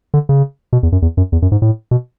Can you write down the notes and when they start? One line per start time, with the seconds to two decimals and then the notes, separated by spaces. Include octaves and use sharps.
0.14 D3
0.29 C#3
0.73 B2
0.83 E2
0.92 F#2
1.02 E2
1.17 F#2
1.32 E2
1.42 F#2
1.52 G#2
1.62 A2
1.91 B2